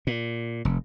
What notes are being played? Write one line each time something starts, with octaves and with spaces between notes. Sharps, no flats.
A#2
F1